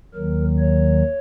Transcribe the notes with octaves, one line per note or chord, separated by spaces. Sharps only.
D#2 D#3 F#3 A#4
C#5